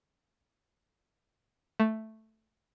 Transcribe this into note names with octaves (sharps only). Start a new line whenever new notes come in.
A3